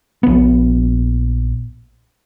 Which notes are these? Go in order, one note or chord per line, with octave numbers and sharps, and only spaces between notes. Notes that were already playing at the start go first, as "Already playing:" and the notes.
A#1 B3